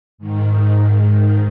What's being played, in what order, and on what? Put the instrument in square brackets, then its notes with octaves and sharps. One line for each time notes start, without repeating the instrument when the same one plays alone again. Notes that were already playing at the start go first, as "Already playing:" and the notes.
[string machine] G#2 D#3